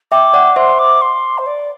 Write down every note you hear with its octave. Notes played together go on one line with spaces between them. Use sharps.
E5 G5 D6
D5 F#5
C5 E5 C6
D6
C6
C5
D5